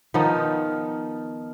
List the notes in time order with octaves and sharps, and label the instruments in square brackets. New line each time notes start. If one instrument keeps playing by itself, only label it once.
[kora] D#3 F3 B3 D#4